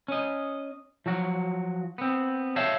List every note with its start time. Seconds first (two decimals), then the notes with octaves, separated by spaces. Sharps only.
0.08 C#4 D#5
1.06 F3 F#3 F#4
1.98 B3 C4
2.56 C#5 E5 F5 G5 A5